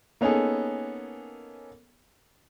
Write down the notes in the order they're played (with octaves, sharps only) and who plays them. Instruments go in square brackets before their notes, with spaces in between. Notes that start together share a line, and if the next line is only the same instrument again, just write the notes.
[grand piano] A#3 B3 C#4 D#4 G#4 A4